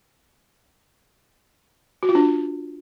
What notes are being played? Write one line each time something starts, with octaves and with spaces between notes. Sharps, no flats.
F#4
F4
D4